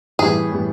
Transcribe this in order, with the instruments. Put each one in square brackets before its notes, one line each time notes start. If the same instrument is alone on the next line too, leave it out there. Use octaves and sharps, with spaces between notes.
[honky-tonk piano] A2 E3 G3 B3 [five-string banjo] G#4
[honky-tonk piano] A2 E3 G3 B3